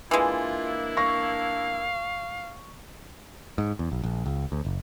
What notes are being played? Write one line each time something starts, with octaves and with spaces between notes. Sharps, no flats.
E3 G#3 A#3 D4 E4 F4
F5 C#6 A#6
G#2
E2
B1
A#1
C#2
D2
F#1